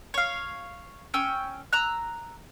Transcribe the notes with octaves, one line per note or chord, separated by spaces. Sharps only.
C#5 F5
C#4 G5 E6
A#5 E6 F#6